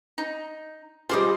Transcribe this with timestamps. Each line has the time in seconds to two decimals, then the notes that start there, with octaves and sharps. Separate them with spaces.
0.18 D#4
1.09 G3 F4 G#4 C5 D5 D#5